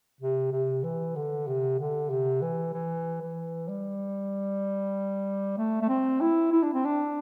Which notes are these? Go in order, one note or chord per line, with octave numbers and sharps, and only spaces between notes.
C3
C3
E3
D3
C3
D3
C3
E3
E3
E3
G3
A3
A3
C4
E4
E4
D4
C4
D4